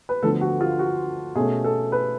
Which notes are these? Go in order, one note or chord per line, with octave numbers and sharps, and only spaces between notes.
B4
D2 D3 F3 B3 A4
F#4
F4
F#4
B2 A3 C#4 G#4
A4
B4